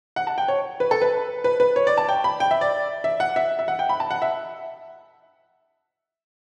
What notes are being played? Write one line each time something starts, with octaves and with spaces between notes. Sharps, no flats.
F#5
A5
G5
C#5
B4
A4
B4
B4
B4
C#5
D5
A5
G5
B5
G5
E5
D5
E5
F#5
E5
E5
F#5
G5
B5
A5
F#5
E5